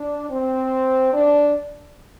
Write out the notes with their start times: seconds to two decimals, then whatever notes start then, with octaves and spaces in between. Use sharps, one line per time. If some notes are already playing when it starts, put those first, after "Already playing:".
Already playing: D4
0.29 C4
1.12 D4